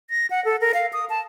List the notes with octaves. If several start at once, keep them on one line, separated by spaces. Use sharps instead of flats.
A#6
F#5
A4
A#4
F5
D#6
A5